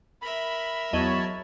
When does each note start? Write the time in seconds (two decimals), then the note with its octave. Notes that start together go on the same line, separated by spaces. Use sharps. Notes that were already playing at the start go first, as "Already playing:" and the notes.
0.22 A#4 E5 B5
0.93 E2 F#3 C#5 D#5 A5 B5